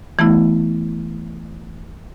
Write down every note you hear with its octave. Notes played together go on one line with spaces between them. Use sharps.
E3 A3 B3 E4